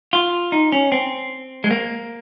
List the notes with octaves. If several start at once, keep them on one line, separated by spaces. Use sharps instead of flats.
F4
D#4
C#4
C4
G#3
A#3